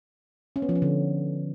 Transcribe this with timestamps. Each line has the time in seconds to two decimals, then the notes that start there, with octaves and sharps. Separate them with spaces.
0.56 C#4
0.62 B3
0.69 F3
0.75 C#4
0.82 D3